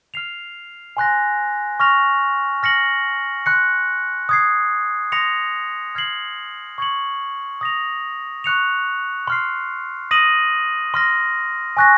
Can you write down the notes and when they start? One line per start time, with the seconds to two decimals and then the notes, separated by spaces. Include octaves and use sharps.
0.14 F6 C7 F7
0.97 G#5 C6 F#6 A#6
1.80 C#6 F6 A#6 F7
2.63 F6 A#6 C#7 F#7
3.46 C6 F#6 C#7
4.29 D#6 G#6 C7
5.12 C6 D#6 A#6 C#7 F7
5.95 F6 G#6 C7 F#7
6.78 C#6 G#6 C#7 F#7
7.61 D#6 A#6 F7
8.44 C#6 F#6 C#7 F7
9.27 C6 F6 C7
10.11 D#6 A#6 D#7 F#7
10.94 C6 F6 A#6
11.77 G#5 C#6 F#6 A#6